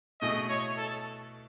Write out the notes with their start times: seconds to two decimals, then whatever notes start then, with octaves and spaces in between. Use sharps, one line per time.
0.21 B2 A3 E4 G#4 D#5
0.49 C#5
0.77 A4